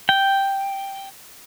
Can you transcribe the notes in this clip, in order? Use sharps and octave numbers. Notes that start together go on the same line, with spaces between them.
G5